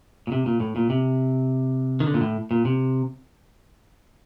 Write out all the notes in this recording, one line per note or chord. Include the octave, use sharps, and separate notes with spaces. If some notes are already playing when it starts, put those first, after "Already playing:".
A#2
C3
A#2
A2
A#2
C3
D#3
D3
A#2
A2
A#2
C3